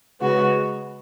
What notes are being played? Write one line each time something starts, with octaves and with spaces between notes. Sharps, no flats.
C#3 G#3 B3 F#4